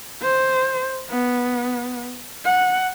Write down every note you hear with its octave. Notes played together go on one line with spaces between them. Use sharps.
C5
B3
F#5